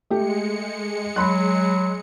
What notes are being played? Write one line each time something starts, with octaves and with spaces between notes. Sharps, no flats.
G#3 A3 G4 C#7
F#3 B5 C6 F#6